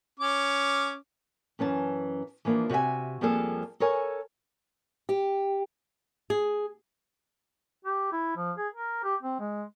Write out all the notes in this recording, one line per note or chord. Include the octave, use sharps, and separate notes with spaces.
C#4 D6
F#2 E3 C#4 A5
E3 F3 A#3 D4 F4
C3 F#4 D5 E5 G#5
F2 F3 G3 A#3 G#4 A4
A4 A#4 C#5 G#5
G4
G#4
G4
E4
F3
G#4
A#4
G4
C4
G#3